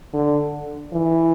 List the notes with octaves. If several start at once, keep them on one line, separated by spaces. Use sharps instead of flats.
D3
E3